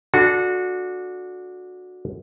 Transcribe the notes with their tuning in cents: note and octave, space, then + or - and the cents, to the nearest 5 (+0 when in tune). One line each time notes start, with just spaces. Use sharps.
D4 +0 F#4 -20 A4 -15